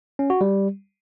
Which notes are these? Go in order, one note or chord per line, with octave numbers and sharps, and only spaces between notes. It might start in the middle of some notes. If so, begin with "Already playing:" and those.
C#4
F#4
G3